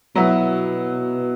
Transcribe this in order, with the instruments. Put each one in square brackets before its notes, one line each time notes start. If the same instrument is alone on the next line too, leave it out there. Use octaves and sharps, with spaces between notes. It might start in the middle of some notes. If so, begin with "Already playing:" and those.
[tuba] B2 [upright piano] F#3 B3 E4